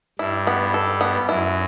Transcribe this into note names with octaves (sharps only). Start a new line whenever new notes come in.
G2 E4
B3
A4
B3
F#2 E4